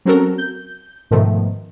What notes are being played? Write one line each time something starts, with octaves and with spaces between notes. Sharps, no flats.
F#3 C4 C#4 F#4 A4 A#4
G6
G#2 B2 D#3 F3 A3